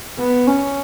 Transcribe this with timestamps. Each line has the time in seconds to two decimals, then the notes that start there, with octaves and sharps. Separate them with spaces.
0.19 B3
0.47 C#4